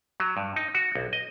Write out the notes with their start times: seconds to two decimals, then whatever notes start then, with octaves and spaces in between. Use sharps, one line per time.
0.20 F#3
0.37 G2
0.56 D#4
0.74 F#4
0.95 B1
1.13 D#5